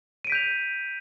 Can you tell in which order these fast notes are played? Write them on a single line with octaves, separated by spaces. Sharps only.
D#7 D7 B6 G6 F7